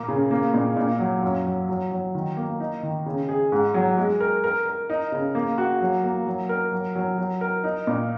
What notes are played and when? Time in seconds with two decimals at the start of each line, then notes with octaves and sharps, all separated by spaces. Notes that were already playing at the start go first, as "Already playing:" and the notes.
Already playing: A#2 A#3
0.08 C#3
0.31 A#3
0.54 A#2
0.77 A#2
0.99 F#3
1.23 F#2
1.46 F#3
1.69 F#3
1.91 F#3
2.15 D#3
2.37 A#3
2.60 D#4
2.83 D#3
3.06 C#3
3.29 G#4
3.52 G#2
3.74 F#3
3.97 G#3
4.21 A#4
4.44 A#4
4.66 A#4
4.90 D#4
5.12 C#3
5.35 A#3
5.58 F#4
5.81 F#3
6.04 A#3
6.26 F#3
6.49 A#4
6.72 F#3
6.95 F#3
7.18 F#3
7.41 A#4
7.64 D#4
7.87 A#2